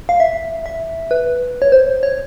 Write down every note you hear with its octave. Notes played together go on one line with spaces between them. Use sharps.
F5
E5
E5
B4
C#5
C5
C#5